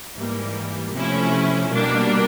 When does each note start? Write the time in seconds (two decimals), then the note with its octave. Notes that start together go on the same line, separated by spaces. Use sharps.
0.15 G#2 E3 G3 A#3
0.93 C3 F3 A3 C#4 E4
1.70 B2 G3 A#3 D4